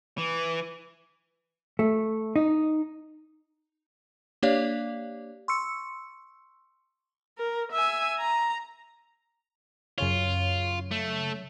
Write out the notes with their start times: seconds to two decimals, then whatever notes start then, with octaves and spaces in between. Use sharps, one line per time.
0.18 E3
1.79 A3
2.36 D#4
4.43 A#3 D4 G4 C#5 D5 F5
5.48 C6 C#6 E6 C#7
7.38 A#4
7.72 E5 G#5
8.18 A#5
9.98 F#2 C#3 F4 C#5
10.91 A3